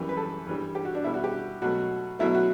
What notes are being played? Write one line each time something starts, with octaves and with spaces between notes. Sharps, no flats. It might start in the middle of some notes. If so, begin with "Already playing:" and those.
Already playing: F#2 E3 G3
B4
A4
G2 E3 G3
G4
F#4
D4
B2 G3 E4
F#4
G4
B2 F#3 A3 F#4
B2 F#3 A3 E4
F#4